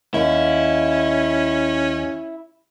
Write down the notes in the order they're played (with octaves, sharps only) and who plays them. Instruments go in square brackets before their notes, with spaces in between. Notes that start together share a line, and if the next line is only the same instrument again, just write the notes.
[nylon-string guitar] D#2 [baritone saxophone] C#4 [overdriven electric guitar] E4